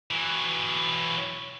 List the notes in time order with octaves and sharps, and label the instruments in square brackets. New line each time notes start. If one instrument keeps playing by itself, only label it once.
[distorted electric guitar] E3 F#3